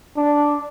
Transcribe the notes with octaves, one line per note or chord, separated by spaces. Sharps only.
D4